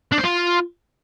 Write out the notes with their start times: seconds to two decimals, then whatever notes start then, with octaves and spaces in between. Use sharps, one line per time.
0.12 D4
0.18 C5
0.24 F4